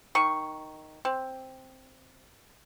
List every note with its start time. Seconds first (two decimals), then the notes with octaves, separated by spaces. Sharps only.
0.15 D#3 C#6
1.05 C4